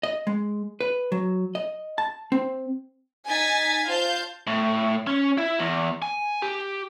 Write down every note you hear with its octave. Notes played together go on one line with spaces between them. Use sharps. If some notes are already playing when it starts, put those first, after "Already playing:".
D#5
G#3
B4
F#3
D#5
A5
C4
D#4 G#5 A6 B6
F4 C5 F5 A5 G6
A2
C#4
E4
E2
G#5
G4